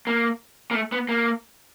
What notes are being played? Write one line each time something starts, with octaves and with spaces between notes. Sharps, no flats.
A#3
A#3
A3
B3
A#3